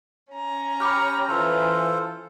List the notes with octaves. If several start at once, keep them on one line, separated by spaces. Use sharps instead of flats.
C#4 A#5
G4 G5 B5 C#6 D6 F6
E3 F4 A4 C5 F6